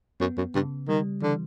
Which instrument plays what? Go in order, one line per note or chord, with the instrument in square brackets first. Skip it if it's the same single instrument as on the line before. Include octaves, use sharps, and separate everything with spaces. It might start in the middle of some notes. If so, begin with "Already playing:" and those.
[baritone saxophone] F#2 [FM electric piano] B3
[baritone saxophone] F#2
[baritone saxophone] G2 [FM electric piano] C#3
[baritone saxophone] D#3 [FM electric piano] G3
[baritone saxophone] D3 [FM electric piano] E3